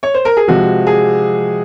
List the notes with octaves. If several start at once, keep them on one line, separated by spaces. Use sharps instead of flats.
C#5
C5
A#4
G#4
C3 F3 G#3 F#4
G#4